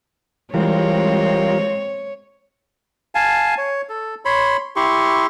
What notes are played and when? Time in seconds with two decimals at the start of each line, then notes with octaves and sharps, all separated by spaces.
0.54 E3 G3 G#3 C4 F4 A#4 C#5
3.15 F5 G#5 A5
3.58 C#5
3.89 A4
4.25 C#5 B5 C6
4.76 E4 G4 C6 C#6